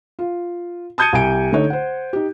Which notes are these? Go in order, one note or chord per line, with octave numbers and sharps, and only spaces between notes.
F4
A5 D#6 G6 G#6 C#7 D#7
C2 G4 G#5 D7
D3 A3 D#4 C#5
C5 F#5
D#4 G4